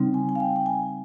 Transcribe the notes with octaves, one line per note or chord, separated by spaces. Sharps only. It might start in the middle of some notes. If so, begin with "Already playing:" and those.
Already playing: C#3 G3 C4 D#4
G#5
G#5
F5
G5
G5
G#5